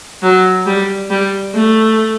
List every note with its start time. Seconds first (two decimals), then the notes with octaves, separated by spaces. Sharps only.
0.23 F#3
0.66 G3
1.10 G3
1.55 A3